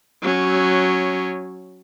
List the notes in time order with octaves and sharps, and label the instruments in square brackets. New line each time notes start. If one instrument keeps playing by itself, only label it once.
[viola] F#3 C#4